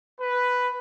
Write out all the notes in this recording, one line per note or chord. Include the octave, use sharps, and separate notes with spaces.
B4